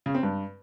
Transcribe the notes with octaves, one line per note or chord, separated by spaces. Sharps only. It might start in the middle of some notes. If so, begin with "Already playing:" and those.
C#3
C4
G2